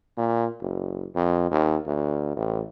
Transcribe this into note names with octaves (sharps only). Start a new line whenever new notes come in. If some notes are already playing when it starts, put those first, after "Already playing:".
A#2
F#1
F2
D#2
D2
A1